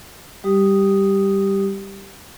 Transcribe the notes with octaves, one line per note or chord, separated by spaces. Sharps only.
G3 G4 D#6